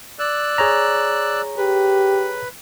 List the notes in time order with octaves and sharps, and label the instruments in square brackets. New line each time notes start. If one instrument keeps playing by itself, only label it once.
[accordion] D5 E6 F#6
[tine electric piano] G#4 C#5 A#5
[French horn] G4 [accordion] B4